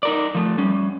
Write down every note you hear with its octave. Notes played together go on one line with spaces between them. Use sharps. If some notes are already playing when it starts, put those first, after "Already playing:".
D#4 A#4 D5
F3 A3
G3 C#4